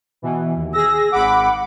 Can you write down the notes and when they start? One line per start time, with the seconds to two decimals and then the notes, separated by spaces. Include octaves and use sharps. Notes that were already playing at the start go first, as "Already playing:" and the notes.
0.22 B2 E3
0.56 D#2
0.73 G#4 E6 A#6
1.12 G#1 F#5 B5 D6